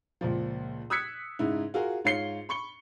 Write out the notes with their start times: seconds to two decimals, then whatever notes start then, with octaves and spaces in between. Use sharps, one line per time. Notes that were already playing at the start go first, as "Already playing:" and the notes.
0.21 C#2 A#2 F3
0.90 D#6 E6 F#6 G#6 B6 C#7
1.39 G#2 C#3 D#4 E4
1.74 F4 F#4 G#4 A#4
2.05 G#2 F4 C#5 C7 C#7 G7
2.49 B5 C#6 C#7 G7